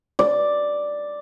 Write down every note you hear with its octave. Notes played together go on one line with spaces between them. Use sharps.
D5